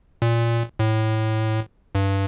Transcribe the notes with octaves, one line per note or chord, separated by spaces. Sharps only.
A#2
A2
G2